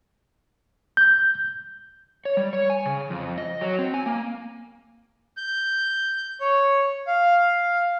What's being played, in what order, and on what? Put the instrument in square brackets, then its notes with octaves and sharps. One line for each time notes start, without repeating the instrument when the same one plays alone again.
[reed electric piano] G6
[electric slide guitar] C#5
G3
C#5
G#5
C#3
F2
D#5
F#3
C4
G#5
A#3
[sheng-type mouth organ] G6
C#5
F5